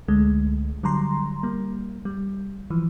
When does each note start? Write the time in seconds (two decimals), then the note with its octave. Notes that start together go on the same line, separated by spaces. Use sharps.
0.08 C#2 D3 G#3 A3
0.83 D3 F#3 G3 A#5 C6
1.43 G3 A#3
2.05 G3
2.70 E3 F3